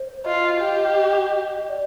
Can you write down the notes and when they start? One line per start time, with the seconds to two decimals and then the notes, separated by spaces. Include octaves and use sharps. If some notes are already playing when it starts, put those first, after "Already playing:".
Already playing: C5
0.25 F4 D#5
0.61 G4
1.69 D5